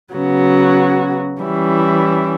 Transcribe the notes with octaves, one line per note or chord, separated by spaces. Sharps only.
C#3 F#3 B3 F#4
E3 G3 C#4 E4